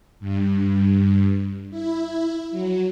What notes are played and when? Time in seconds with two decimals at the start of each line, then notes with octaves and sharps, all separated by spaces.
0.20 G2
1.71 E4
2.51 F#3